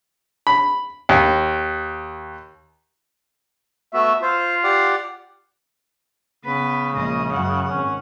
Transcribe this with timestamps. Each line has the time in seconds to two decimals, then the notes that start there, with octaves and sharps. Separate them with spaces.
0.47 B5
1.09 D#2
3.94 A3 B3 F#4 E5
4.22 F4 C5
4.64 G4 D5 F#5
6.45 C#3 B3 B4
6.95 A#1 G#3 D#5
7.33 F#2 F#5
7.70 G#1 C#4